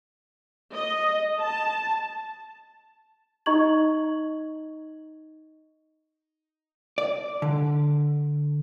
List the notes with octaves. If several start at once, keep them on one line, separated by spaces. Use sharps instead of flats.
D#5
A5
D#4 D#5 A#5 C#6 G#6 F#7
D5
D3